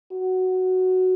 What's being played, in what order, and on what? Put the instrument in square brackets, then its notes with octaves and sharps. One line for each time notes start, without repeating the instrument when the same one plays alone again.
[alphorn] F#4